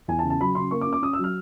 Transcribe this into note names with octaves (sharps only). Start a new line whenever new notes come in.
E2 G#5
A5
C#3
A5
F#3 B5
C#3 C6
A#3 C#6
D6
C#4
D6
C#4 D#6
E6
F#3
F6